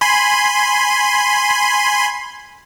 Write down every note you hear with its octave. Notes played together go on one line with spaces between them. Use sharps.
G#5 B5 C6